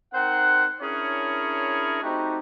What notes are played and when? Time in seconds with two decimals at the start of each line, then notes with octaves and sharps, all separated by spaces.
0.13 C4 D#4 A#4 C5 F#5
0.82 C#4 D4 E4 G#4 A#4 C#5
2.02 A3 C4 D#4 F#4 G4